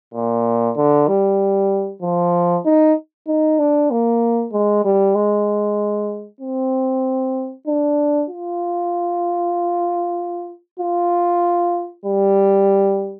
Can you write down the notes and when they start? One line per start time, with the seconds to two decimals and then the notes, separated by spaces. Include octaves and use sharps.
0.14 A#2
0.76 D3
1.08 G3
2.02 F3
2.65 D#4
3.27 D#4
3.59 D4
3.90 A#3
4.52 G#3
4.84 G3
5.15 G#3
6.41 C4
7.67 D4
8.30 F4
10.79 F4
12.05 G3